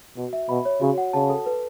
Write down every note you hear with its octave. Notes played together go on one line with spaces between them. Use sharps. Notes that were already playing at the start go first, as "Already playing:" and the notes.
B2 F#4
E5
B2 B5
C#5
C#3 F#4
F#5
C#3 A5
A4
B4